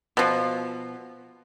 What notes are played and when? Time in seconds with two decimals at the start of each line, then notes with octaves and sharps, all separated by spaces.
0.17 B2 F3